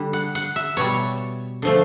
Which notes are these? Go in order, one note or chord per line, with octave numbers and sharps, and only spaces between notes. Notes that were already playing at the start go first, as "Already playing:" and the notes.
Already playing: D3 G3
F#5
F#5
E5
B2 G3 C#5
D3 F3 A3